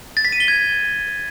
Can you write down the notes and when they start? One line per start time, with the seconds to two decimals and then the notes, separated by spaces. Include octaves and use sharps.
0.17 A6
0.25 B6
0.32 D#7
0.40 G7
0.48 G#6